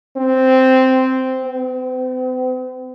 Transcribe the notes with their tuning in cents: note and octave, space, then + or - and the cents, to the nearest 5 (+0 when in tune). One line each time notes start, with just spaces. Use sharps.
C4 -5
C4 -45